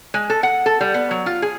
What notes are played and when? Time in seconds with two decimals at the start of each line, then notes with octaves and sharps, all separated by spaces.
0.14 G#3
0.30 A4
0.43 F#5
0.66 A4
0.81 G3
0.94 B3
1.11 F#3
1.26 F4
1.42 G#4